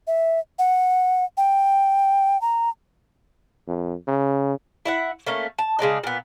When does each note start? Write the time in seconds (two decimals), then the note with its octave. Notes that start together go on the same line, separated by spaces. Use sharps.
0.07 E5
0.59 F#5
1.37 G5
2.42 A#5
3.68 F2
4.08 C#3
4.86 E4 E5 F#5
5.26 A3 A#3 C#4
5.58 A5
5.79 C#3 G#3 D4 D#4
6.04 A#2 B3